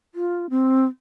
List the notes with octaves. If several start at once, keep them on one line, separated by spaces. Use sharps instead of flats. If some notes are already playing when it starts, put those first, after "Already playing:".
F4
C4